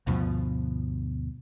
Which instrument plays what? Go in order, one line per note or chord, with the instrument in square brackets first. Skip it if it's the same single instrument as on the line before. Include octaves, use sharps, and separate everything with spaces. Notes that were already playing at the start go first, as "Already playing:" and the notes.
[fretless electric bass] D2 G2 B2 F3